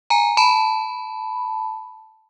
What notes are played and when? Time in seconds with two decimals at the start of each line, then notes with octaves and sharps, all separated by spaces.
0.10 G#5 A#5
0.37 A5 B5